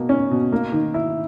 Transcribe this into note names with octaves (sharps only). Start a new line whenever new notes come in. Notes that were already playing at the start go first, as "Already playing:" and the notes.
Already playing: B2 A#3
C#4
B2
A#3
D#3
E4